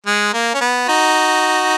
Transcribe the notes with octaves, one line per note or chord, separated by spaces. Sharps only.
G#3
A#3
C#4
B3
D#4 F#4